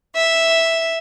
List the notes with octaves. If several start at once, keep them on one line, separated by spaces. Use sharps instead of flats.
E5